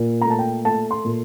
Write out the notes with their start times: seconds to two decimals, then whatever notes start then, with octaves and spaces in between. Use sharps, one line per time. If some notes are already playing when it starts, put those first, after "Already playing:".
Already playing: A#2
0.21 A#5
0.25 A3
0.30 A5
0.39 G5
0.65 A3 A5
0.91 C6
1.05 A#2